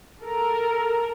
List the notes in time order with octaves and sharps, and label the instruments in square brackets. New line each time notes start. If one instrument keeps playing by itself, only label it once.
[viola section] A4 A#4